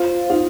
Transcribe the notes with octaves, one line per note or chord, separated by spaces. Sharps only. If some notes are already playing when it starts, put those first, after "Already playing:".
Already playing: F4 C5
D#4 F4